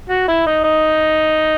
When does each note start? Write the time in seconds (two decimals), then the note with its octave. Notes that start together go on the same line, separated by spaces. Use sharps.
0.09 F#4
0.28 E4
0.47 D#4
0.64 D#4